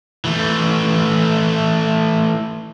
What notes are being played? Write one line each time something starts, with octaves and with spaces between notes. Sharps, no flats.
E3 A3